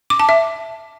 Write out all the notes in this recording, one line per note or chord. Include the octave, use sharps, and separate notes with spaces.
D6
A5
E5